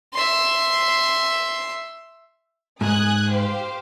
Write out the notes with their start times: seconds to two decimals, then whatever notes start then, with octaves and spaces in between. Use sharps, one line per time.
0.14 E5 C6
2.81 G#2 G#5 D#6 F#6
3.29 G4 C5 F5